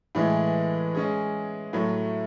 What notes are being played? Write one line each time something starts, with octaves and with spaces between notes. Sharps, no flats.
A2 E3 G#3
G#3 C#4 G#4
A2 F#3 A3